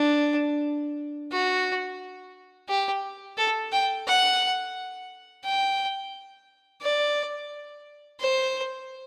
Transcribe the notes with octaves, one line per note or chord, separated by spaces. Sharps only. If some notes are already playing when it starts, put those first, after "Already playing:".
Already playing: D4
F#4
G4
A4
G5
F#5
G5
D5
C5